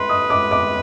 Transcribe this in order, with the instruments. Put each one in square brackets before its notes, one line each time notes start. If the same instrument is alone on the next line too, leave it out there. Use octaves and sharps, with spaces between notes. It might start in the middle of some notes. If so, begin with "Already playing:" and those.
Already playing: [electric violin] B4 [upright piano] C6
[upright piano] D#6
D6
D6